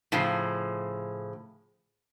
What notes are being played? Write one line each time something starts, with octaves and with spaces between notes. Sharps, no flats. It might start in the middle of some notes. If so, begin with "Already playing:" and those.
A2 C#3 F3